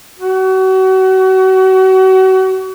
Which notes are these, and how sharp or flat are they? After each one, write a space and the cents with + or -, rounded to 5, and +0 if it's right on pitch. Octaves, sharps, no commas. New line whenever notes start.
F#4 +35